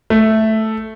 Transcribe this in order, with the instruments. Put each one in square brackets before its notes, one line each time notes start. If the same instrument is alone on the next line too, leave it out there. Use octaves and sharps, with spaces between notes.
[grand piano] A3